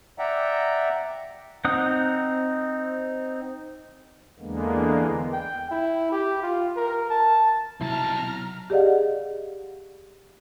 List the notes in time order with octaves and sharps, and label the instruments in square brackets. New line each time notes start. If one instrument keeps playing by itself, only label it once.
[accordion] D5 E5 F#5 G5 A#5
[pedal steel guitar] C4 D#4 F#5 D#6 F#6
[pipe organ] E2 D3 G#3 A#3 B3
[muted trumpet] G5
E4
G4
F4
A#4
A5
[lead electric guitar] B1 A5 [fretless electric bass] C3 F#3 [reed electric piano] E4 [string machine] A#5 F6
[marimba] G4 G#4 D5 D#5 F5 F#5